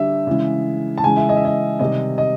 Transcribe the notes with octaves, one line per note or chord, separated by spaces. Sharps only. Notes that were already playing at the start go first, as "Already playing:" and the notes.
Already playing: D3 G3 E5
C#3 E3 G#3
A5
C#3 E3 G#3 G#5
E5
D#5
E5
D#5
C3 D#3 G3 D#5
D#5